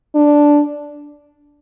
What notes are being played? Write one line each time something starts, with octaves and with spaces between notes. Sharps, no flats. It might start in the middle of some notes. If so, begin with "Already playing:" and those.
D4